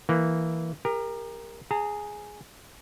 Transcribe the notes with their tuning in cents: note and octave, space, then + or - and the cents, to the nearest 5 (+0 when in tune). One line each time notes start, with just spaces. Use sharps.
E3 +0 A#3 -5
G4 +40 A#4 +0
G#4 +0 A#5 -40